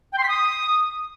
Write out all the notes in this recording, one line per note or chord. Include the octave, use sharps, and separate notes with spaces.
G5
C6
B6
D#6